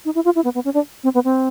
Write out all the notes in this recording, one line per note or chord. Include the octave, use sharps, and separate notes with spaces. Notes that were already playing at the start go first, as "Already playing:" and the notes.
D#4
E4
F4
E4
B3
B3
C#4
D4
C4
B3
C4